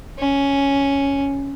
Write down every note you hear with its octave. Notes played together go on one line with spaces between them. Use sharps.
C#4